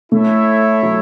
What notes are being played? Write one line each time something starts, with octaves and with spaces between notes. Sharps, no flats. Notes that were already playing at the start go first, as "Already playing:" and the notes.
A3 E4 A4 C#5 E5
F#3